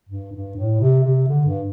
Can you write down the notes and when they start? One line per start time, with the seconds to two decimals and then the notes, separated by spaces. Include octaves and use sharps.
0.09 G2
0.33 G2
0.57 A2
0.81 C3
1.04 C3
1.28 D3
1.46 G2